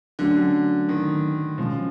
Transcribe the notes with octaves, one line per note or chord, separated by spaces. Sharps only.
D3 F#3 A3 C#4 F#4
D#3
B2 F3 G#3 C#4